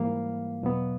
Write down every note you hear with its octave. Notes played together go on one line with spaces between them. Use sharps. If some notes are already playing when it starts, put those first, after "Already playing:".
Already playing: G#2 E3 G3 A#3 F5
E2 B2 F#3 B3